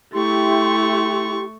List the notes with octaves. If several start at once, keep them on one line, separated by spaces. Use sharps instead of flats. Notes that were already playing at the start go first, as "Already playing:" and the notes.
A3 E4 G4 C6 C#6